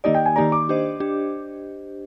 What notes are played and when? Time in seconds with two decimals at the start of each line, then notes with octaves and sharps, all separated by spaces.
0.04 D#3 A#3 D#4 G4 D5 D#5
0.14 G5
0.26 G#5
0.36 D#3 A#3 D#4 G4 D5 A#5
0.52 D6
0.69 D4 G4 C5 D#5
1.00 D4 G4